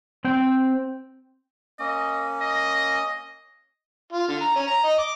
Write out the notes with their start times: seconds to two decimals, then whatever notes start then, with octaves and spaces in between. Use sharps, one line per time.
0.25 C4 G5
1.79 A#3 C#4 D#5
2.41 D#5
4.13 F4
4.28 D3
4.41 A#5
4.56 C#4
4.67 A#5
4.84 D#5
4.99 D6